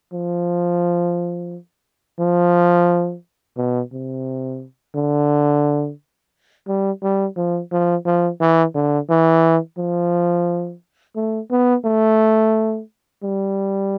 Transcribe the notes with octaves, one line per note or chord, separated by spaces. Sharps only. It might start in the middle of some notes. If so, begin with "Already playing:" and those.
F3
F3
B2
C3
D3
G3
G3
F3
F3
F3
E3
D3
E3
F3
A3
B3
A3
G3